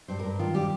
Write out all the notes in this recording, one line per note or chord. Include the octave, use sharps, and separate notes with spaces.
G2 C5
A#4
G2
D#3 F4
G3 G4